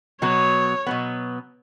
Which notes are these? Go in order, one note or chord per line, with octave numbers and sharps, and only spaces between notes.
B2 F#3 B3 C#5
B2 F#3 B3